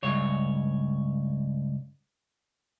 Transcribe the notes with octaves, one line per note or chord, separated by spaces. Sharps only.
C#2 G2 C#5